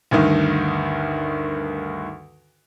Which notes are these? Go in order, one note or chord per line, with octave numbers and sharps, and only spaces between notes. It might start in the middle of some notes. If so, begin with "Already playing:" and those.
D2 G2 D#3